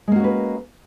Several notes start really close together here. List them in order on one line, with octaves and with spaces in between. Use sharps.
G#3 A#3 F#4 C#4 B4